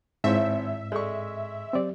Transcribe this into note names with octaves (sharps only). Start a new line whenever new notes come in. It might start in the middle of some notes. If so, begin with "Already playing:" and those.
G#1 G#2 C4 E4 C5 C#5 E5 F5
G#3 A4 D5 C#6
F#3 C4 G4 D5